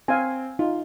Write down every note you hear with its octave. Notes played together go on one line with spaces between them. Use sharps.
C4 F5 G#5
D#4 F4